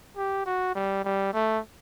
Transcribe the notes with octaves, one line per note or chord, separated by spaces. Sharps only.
G4
F#4
G3
G3
A3